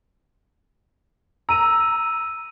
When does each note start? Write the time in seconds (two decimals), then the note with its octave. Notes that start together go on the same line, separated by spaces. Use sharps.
1.49 A#5 E6 D#7